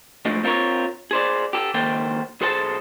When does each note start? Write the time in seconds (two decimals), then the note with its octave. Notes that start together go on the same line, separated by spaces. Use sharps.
0.25 G#2 D3 F3 G#3 A3
0.43 C4 F4 A4 A#4 C#5
1.11 G#4 C5 D5
1.53 G4 A4
1.74 C#2 D#3 A#3 A4 C5 G5
2.41 B1 G#4 A4 C5 G5 A5